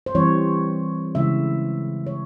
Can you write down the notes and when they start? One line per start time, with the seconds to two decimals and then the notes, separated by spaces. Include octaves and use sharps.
0.06 C5
0.15 E3 G3 C4 C#5
1.15 C#3 E3 G#3 E4 E5
2.07 C#5